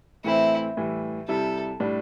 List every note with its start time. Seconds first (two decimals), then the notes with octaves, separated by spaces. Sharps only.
0.24 A2 E3 A3 C4 E4
0.77 A2 E3 G3
1.28 C3 G3 E4 A4
1.80 A2 G3 D4